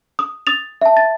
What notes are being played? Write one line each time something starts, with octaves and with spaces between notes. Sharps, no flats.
D#6
D#6 A6 F7
E5 A5
A6